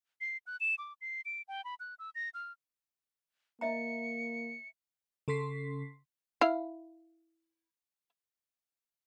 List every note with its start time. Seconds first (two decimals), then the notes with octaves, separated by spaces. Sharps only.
0.21 C7
0.47 F#6
0.60 E7
0.78 D6
1.01 C7
1.25 D7
1.48 G5
1.64 B5
1.80 F#6
1.99 E6
2.15 A#6
2.34 F6
3.61 A#3 D#5 E5 A#5 C#7
5.28 C#3 A4 C6 B6 C7
6.41 E4 F5